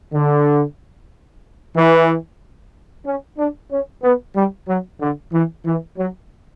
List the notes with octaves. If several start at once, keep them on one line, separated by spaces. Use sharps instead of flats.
D3
E3
C#4
D4
C#4
B3
G3
F#3
D3
E3
E3
F#3